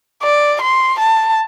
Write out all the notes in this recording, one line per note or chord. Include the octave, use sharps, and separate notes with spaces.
D5
C6
A5